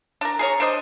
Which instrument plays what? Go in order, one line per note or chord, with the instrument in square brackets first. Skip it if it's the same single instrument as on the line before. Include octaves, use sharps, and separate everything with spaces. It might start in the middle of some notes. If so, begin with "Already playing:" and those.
[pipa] D4 A#4
G#4 A#4 C#5
D4 C5 D#5